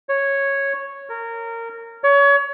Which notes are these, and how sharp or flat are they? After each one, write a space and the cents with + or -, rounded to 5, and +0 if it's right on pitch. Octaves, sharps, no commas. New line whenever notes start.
C#5 -5
A#4 -20
C#5 +30